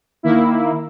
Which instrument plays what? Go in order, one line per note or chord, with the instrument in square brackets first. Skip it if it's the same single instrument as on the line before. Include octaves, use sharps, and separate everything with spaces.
[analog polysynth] D#3 A#3 E4